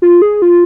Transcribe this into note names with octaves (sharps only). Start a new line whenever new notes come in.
F4
G#4
F4